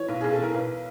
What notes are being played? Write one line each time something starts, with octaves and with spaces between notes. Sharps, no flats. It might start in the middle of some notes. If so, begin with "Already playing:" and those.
Already playing: E3 C#5
B1
B1 G#4
A4
E3 A#4
B1 B4